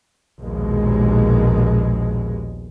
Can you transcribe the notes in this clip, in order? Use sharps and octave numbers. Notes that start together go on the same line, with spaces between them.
A#1 D#2 B2 G#3